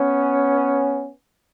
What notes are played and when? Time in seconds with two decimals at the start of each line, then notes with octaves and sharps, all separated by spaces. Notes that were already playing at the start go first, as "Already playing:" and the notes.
Already playing: B3 C#4